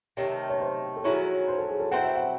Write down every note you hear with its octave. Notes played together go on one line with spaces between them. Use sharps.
C3 D#3 A3 C#5
C#5
C5
A4
D#3 F#3 C#4 E4 G#4
C5
A4
G#4
A4
F#3 C4 E4 C5 F#5
E5
F#5